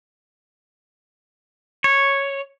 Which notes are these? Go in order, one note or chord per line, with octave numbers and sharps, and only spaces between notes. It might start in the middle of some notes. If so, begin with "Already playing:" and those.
C#5